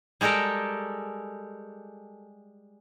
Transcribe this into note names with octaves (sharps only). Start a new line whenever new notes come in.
G3 G#3 G4 A4 A#4